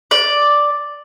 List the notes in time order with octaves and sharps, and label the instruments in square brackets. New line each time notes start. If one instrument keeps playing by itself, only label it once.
[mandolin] D5